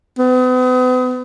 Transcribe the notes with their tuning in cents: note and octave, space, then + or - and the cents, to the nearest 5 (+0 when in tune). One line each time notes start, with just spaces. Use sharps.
B3 +40